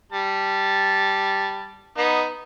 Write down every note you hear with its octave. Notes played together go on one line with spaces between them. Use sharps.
G3 A5
B3 D#4